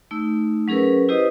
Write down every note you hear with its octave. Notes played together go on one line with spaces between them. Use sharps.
A3 D#4 E6
F#3 C#4 G#4 A#4 B4
E4 G4 B4 C5 D#5 D#6